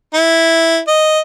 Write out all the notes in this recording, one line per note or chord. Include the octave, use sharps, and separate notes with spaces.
E4
D#5